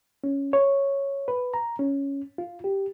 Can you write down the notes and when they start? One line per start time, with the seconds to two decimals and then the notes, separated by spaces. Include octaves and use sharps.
0.24 C#4
0.53 C#5
1.28 B4
1.54 A#5
1.79 C#4
2.38 F4
2.64 G4